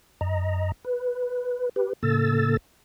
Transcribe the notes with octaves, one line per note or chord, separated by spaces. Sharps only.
F#2 D#5 A#5
B4
G4 B4
A2 C#3 A#3 A4 E6 A6